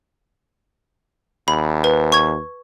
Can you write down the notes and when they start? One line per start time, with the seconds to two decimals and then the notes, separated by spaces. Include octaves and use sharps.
1.48 D#2 B5
1.84 B4
2.12 C#6 G#6